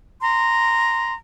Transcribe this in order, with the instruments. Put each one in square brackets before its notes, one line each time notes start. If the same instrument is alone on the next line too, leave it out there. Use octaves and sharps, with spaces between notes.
[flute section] A#5 C6